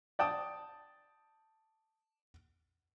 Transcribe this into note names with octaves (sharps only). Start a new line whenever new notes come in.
D5 G5 A5 D#6